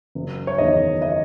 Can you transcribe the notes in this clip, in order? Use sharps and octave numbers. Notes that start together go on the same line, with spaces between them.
F#1
C#5
E2 D#3 D#5
D#5